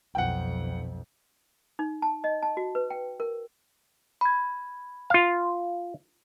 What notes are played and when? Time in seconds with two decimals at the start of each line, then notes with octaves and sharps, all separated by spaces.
0.15 B1 F2 F#5 G5
1.79 D#4
2.02 A5
2.24 D#5
2.43 A5
2.57 F#4
2.75 B4
2.90 G5
3.20 A#4
4.21 B5 G#6
5.10 F4 F5